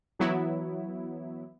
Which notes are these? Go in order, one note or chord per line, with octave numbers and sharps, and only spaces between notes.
E3 F#3 B3 E4